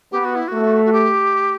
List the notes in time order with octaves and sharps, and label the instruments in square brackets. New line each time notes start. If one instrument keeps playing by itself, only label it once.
[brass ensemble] B3 [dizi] G4
[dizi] F#4
E4
[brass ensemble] A3 [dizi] F#4
[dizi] F#4
G4